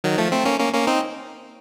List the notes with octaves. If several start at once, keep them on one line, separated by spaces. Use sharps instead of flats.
D#3 F#3
F3 A3
A3 C4
A#3 C#4
A#3 C#4
A#3 C#4
C4 D#4